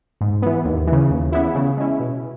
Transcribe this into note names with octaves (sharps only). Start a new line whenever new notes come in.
G#2
E3 B3
D#2
E3
C#3
D#2
C#3 E3 B3 E4
C#3
G#3 C#4 E4
B2